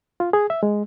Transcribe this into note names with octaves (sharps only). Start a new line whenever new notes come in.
F4
G#4
E5
G#3